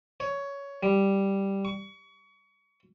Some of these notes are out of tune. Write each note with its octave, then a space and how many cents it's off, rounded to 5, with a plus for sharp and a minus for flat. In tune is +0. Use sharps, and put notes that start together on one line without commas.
C#5 +15
G3 +0
C#6 +30